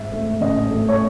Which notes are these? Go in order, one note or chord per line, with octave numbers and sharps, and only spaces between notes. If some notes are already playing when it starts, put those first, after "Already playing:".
Already playing: G#2 E5
A3
A1 D#5
A3
C#5